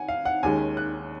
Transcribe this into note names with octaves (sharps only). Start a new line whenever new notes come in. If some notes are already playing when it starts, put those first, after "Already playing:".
Already playing: F#5 G#5
F5
F#5
D#2 D#3 G#3 C#4 G#5
F#6